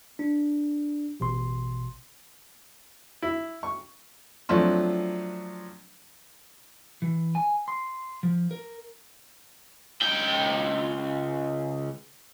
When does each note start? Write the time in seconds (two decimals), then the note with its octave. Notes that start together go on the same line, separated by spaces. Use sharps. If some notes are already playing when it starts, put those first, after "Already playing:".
0.19 D4
1.20 A1 B2 C6
3.22 E4
3.63 C#6
4.49 F3 F#3 A3 C4 D4 F4
7.02 E3
7.35 G#5
7.68 C6
8.23 F3
8.51 A#4
10.02 C#2 G5